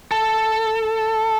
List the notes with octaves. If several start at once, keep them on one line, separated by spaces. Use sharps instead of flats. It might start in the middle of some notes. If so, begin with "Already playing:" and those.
A4